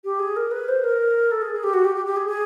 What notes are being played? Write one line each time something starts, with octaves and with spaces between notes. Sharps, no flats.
G4
G#4
A#4
B4
C5
A#4
A4
G#4
G#4
G4
F#4
G4
G4
G4
G#4
G#4